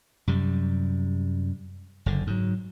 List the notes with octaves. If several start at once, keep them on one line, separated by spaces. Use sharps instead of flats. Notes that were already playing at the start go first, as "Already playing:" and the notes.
F#2 C3 G3
F#1 D3
G#2 F#3